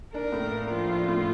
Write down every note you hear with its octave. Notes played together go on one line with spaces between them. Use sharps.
D4 A#4
A2
A#3
F3 F4
D4
A2